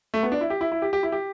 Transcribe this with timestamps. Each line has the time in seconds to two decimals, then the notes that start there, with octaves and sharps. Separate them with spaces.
0.14 A3
0.23 B3
0.32 D4
0.41 E4
0.50 G4
0.61 E4
0.72 E4
0.82 G4
0.93 G4
1.03 E4
1.12 G4